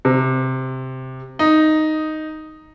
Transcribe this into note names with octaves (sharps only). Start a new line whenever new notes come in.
C3
D#4